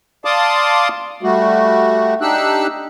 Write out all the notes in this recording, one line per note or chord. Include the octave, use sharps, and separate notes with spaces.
D5 F5 A5 C6 D6 D#6
G3 A3 F#4
D4 D#4 G4 E6 F#6